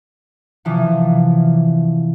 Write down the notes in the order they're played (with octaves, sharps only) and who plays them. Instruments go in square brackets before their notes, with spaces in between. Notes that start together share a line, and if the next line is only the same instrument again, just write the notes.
[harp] C3 E3 F3